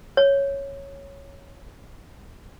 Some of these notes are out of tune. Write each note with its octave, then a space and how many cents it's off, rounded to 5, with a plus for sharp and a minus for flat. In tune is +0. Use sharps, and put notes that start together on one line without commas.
C#5 -5